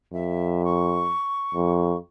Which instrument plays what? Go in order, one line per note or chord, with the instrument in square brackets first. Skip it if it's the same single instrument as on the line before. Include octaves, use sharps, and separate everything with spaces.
[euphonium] F2 [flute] E5
[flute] C#6
[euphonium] F2